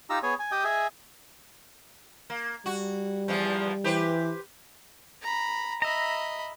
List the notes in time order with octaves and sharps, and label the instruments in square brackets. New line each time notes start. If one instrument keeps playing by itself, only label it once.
[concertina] D#4 F4 G4 A#5 E6
B3 G#4 C#5 G#5
G#5
G4 D#5 G5 D#6
G#4 D#5 E5 G#5
[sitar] A#3
[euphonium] G3 [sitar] F#4
[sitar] E2 E3 F3
[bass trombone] E3 [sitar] G4 B4 C5
[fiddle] A#5 B5
[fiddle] D#5 B5 [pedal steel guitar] E5 A#5